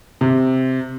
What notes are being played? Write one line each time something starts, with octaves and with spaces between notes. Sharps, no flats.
C3